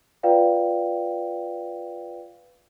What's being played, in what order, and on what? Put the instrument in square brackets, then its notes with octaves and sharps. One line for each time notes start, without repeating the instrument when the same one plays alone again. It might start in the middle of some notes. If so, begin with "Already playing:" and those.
[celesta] F4 B4 D5 F5 G5